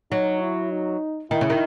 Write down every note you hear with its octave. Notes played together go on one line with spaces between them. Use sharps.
F#3 D#4
E4
D#4
D#3 E4
C#3
D#3